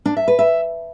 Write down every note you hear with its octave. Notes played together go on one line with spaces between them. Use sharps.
D4
E5
B4
E5